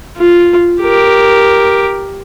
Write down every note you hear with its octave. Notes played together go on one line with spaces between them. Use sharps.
F4
G4 A#4